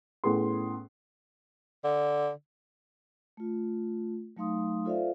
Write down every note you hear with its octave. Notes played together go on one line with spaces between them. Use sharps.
A2 A3 B3 C#4 G#4 C6
D3
A3 F4
F#3 A3 D#4 F5 C6 D#6
F4 A4 C5 D5 E5 F5